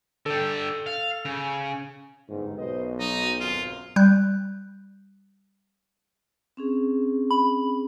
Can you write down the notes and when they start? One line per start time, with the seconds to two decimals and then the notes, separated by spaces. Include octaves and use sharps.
0.26 D3 G4 A4
0.86 F5
1.25 C#3
2.29 G1 D#2 G#2 D#3
2.58 B1 B4 C5 D#5
3.00 F#3 D#4
3.40 G#1 F#2 F4
3.96 G3 F#6 G6
6.57 C4 C#4 G#4
7.31 B5